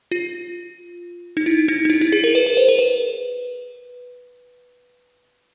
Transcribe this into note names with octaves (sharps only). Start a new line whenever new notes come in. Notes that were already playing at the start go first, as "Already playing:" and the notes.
F4
D#4
E4
D#4
D#4
E4
E4
G#4
A#4
B4
B4
C5
A#4
B4